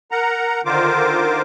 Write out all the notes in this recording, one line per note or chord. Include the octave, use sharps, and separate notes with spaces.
A#4 F#5 A#5
D3 D#3 F4 A#4 C5 D6